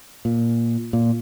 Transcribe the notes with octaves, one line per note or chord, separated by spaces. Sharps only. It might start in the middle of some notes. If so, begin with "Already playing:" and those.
A#2
A#2